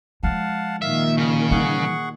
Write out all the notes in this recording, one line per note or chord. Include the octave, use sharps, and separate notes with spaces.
F3 G#3 F5 F#5 A5
A#2 D#3 E5 F5
C#3 C#6
E3 G3 G#4 F#5 C#6